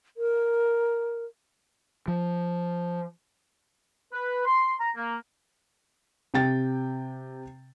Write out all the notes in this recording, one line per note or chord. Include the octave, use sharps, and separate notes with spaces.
A#4
F3
B4
C6
A#5
A#3
C3 G5 A6